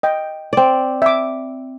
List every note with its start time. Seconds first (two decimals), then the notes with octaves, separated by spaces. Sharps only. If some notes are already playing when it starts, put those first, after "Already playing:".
0.03 D#5 G5
0.53 C4 D5
1.02 E5 D6